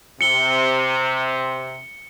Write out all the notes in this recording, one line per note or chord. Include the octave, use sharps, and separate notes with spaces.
C3 C#7 G7